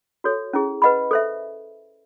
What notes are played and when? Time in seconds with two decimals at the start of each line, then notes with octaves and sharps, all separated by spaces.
0.24 F#4 A4 C#5
0.53 C#4 E4 G#4
0.82 B4 D#5 F#5 B5
1.11 A4 C5 E5